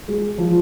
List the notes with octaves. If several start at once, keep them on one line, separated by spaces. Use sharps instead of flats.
G#3
F3